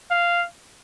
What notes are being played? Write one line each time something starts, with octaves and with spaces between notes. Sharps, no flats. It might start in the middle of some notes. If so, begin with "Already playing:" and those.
F5